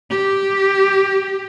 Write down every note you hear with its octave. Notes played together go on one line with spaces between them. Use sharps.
G4